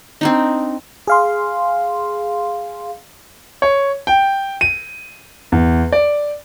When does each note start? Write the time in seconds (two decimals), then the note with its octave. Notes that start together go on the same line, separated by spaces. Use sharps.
0.21 C4 D4 D#4
1.07 G#4 F5 C6
3.62 C#5
4.07 G5
4.61 D#7
5.52 E2
5.92 D5